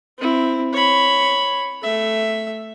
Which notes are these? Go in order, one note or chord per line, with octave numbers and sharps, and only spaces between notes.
C4 E4
C#5 B5
A3 E5